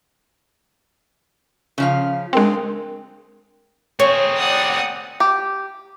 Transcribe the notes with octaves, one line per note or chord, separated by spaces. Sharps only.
C#3 F3 F5
G#3 C4 D4 A#4 G5
C4 G#4 C#5
D5 F#5 D#6
G4